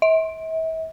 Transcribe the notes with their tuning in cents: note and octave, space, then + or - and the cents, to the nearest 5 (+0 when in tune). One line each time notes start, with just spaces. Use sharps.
E5 -40